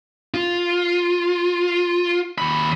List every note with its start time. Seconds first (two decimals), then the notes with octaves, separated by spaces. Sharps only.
0.34 F4
2.38 D#2 B5